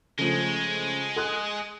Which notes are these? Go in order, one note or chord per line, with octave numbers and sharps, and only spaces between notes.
C#3 F3 G#3 A3
G#4 C6 F#6